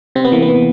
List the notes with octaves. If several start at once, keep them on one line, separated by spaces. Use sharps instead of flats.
C3 C4
B3
E3 A#3
B3
E3